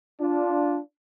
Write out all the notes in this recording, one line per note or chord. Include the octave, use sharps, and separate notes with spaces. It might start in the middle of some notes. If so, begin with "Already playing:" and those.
D4 F4